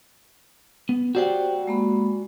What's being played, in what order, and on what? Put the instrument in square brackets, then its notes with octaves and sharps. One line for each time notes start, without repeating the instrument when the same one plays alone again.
[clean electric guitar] B3
[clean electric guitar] F#4 D5 F#5 [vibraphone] G4 C5 G5
[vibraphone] G#3 A#3 B5